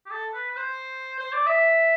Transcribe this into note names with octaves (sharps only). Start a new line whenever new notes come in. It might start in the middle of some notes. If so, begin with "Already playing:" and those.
G4
A4
B4
B4
C5
C5
D5
E5